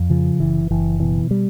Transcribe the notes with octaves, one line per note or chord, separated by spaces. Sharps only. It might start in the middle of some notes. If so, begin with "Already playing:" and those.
Already playing: F2
C#3 F3
F#1 E3
F#1 E3
B2 E3
G3